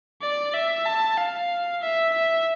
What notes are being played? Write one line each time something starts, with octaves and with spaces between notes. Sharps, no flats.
D5
E5
A5
F5
E5
E5